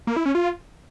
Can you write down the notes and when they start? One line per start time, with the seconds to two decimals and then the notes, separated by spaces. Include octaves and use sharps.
0.07 A#3
0.16 E4
0.26 C#4
0.35 F4